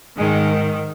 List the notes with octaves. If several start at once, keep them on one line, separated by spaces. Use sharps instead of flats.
G#2 D#3 G#3